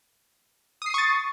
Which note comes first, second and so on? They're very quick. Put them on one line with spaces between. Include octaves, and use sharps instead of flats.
D#6 C7 D#7 C#6 A6